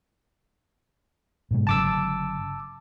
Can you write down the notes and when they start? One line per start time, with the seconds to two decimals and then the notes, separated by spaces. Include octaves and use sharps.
1.51 G#2 B2 G#3
1.67 G1 C#3 F#3 A5 D6 E6